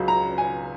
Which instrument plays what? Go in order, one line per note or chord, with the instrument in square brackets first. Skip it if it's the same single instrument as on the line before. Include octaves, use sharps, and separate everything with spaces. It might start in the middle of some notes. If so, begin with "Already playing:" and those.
Already playing: [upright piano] C#2 C#3 F#3
A#5
G#5